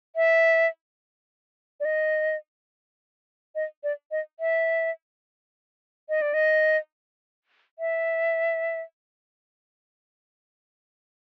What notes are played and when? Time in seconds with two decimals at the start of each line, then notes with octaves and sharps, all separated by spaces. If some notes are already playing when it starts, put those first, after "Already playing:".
0.16 E5
1.80 D5
1.85 D#5
3.55 D#5
3.83 D5
4.11 D#5
4.40 E5
6.09 D#5
6.22 D5
6.34 D#5
7.79 E5